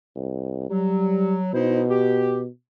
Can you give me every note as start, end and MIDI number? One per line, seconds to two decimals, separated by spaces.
0.16 0.70 36
0.70 1.48 54
0.70 1.37 55
1.53 2.47 47
1.53 1.82 63
1.53 1.82 64
1.53 1.82 72
1.89 2.40 67